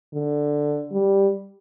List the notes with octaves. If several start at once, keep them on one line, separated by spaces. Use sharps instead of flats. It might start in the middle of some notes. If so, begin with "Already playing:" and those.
D3
G3